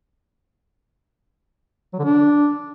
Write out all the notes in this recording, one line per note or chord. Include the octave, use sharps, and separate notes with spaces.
F#3
D3
D4